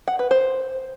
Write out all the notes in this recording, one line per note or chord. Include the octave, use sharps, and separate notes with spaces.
F#5
B4
C5